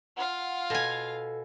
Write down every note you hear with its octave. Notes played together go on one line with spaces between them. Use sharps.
F4 F5 F#5
B2 A4 G#5